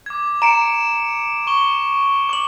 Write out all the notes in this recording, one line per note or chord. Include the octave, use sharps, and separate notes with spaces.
D6 G#6
A#5 C#7 D7 E7
C#6 G7
D6 F#7